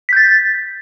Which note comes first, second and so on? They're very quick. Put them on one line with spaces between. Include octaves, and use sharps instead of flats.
B6 G6 A6